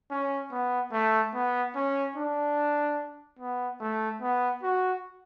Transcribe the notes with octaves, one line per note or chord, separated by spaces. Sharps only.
C#4
B3
A3
B3
C#4
D4
B3
A3
B3
F#4